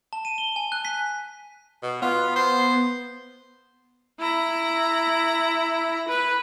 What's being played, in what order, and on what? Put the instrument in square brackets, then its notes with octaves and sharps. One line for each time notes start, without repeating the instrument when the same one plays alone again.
[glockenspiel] A5
D#7
G7
G#5
F#6
B6
[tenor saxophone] B2
[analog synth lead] B3 [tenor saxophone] F4
[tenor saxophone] C5
[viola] E4 A#5
B4